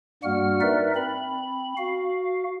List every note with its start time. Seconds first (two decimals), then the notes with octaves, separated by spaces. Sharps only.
0.23 G2 G3 A#3 F#4 F#5 F6
0.61 D#4 A#4 B4 D5 E5
0.96 C4 B5
1.77 F#4 F5